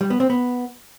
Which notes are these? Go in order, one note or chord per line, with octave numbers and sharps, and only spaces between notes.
G3
B3
C4
B3